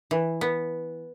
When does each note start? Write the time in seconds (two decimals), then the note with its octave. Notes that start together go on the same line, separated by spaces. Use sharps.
0.11 E3
0.41 B3